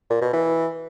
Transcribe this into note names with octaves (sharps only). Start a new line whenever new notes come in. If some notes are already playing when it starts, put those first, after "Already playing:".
A#2
B2
E3